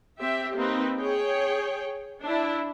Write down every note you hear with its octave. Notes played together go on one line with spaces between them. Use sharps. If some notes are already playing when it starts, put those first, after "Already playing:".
C4 G4 E5
A#3 C4 D#4 B4
G#4 C#5 G5
D4 E4